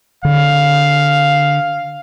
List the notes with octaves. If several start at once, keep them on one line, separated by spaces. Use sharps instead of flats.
D3 F5